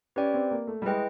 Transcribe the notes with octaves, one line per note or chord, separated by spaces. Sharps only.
C#4 G4 B4 D5 G5
C4
A#3
A3
G3
G#3 E4 G#4 B4 D#5 G5